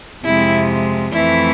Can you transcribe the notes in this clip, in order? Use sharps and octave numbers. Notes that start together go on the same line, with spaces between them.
F2 C3 G#3 E4
F2 E3 A3 E4